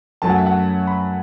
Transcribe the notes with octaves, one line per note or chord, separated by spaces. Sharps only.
F#2 F#3 A3 A5
F#5
E5
F#5
B5